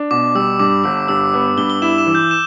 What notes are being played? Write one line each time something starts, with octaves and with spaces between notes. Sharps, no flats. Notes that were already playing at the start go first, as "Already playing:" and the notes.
Already playing: D4
B2 D6
G3 E6
G2 D6
G1 E6
G2 E6
B3
G2 G7
G7
E4 E7
E7
E3
G6
E7